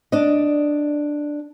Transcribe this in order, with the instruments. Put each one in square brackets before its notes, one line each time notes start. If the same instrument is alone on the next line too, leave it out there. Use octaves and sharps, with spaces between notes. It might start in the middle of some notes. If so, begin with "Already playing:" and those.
[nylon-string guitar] D4 D5 D#5